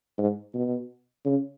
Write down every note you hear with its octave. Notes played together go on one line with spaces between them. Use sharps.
G#2
B2
C#3